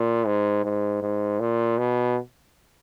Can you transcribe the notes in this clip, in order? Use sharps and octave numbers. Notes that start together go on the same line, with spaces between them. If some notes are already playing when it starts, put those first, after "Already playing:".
Already playing: A#2
G#2
G#2
G#2
A#2
B2